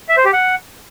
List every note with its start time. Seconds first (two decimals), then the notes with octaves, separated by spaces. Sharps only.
0.09 E5
0.17 C5
0.25 G4
0.33 F#5